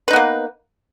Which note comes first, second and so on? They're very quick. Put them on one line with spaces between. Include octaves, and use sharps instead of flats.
B4 D#4 B3 A#3